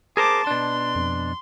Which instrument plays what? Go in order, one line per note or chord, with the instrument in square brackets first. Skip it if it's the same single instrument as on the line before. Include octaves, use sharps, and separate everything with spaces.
[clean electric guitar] G#4 A#4 C5 [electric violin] A5 D6
[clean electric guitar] B2 D4 [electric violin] C6
[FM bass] F2